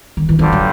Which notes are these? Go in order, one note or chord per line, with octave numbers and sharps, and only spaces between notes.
D#3
E3
G2 D3 F3 G3
F#3